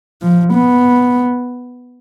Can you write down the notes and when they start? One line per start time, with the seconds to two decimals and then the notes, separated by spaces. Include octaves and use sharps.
0.22 F3
0.54 B3